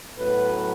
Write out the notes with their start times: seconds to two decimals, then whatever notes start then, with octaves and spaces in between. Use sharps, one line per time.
0.17 A2 F#3 B3 B4